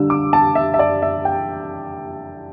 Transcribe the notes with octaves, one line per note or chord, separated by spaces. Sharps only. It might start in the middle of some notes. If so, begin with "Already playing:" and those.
Already playing: D3 G3 D4 E6
D6
A5
E5
E5
D5
E5
G5